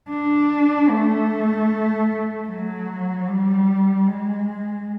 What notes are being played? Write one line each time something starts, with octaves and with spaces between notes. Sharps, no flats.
D4
A3
F#3
G3
G#3